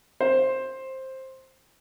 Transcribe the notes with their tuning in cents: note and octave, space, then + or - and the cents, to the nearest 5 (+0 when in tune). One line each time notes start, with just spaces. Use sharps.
C5 +10